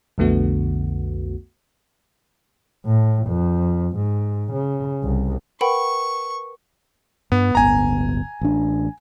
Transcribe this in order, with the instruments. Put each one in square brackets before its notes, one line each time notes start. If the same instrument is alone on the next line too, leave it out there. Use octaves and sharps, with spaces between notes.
[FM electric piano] B1 F2 D3 A3 B3 F#4
[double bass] A2
F2
G#2
C#3
C2
[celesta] A#4 B4 [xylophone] F#5 G5 B5 [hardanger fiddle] C#6
[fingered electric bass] G2 [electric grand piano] B3
[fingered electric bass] D1 G1 B3 [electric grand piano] G#5 A#5
[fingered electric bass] A1 D4